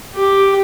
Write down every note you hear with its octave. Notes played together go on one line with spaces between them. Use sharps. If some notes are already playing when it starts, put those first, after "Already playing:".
G4